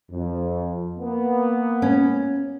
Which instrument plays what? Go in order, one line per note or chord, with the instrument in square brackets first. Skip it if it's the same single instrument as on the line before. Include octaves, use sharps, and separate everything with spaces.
[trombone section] F2
A#3 B3
[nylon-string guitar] C#4